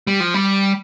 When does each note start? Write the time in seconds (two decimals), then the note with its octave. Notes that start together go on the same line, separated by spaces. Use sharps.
0.07 G3
0.20 F3
0.34 G3